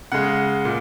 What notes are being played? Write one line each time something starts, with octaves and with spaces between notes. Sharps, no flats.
C#3 G#3 F#5
A#2